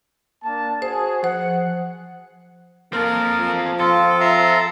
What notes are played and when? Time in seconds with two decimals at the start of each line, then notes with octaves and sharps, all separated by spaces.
0.44 A#3 D4 A5
0.82 F#4 G#4 C5
1.23 F3 C5 F#5
2.93 A#3 C4 A4 A#4
3.40 F3
3.80 C4 F4 A4
4.20 E5 A#5 C6